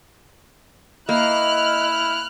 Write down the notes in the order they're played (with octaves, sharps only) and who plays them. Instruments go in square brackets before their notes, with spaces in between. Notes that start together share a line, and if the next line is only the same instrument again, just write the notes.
[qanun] A#3 [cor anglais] E4 [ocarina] D#5 [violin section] F6 F#6